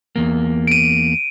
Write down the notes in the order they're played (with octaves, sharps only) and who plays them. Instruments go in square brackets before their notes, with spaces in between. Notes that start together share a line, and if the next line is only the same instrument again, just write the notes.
[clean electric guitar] E2 A#3
[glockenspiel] D7 D#7